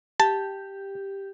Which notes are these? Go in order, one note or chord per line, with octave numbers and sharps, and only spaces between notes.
G4 A5